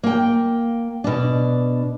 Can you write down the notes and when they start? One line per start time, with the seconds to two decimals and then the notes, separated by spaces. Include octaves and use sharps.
0.03 A#3 G5
1.04 B2 D4